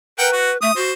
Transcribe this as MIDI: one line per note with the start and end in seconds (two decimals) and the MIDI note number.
0.18 0.27 70
0.18 0.57 71
0.18 0.27 78
0.18 0.27 79
0.32 0.51 66
0.62 0.71 57
0.62 0.74 87
0.76 0.92 66
0.76 0.92 72